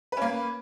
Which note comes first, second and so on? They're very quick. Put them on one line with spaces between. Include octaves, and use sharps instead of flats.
B4 C#4 A#3